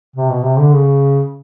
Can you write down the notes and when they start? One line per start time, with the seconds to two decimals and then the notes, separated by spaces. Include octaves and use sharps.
0.16 C3
0.30 B2
0.44 C3
0.59 D3
0.73 C#3